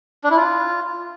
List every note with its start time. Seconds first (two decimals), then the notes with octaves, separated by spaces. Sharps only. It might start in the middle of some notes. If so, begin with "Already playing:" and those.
0.24 D4
0.30 E4
0.37 F4